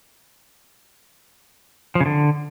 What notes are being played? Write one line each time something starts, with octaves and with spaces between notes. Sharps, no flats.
F3
C#3
D3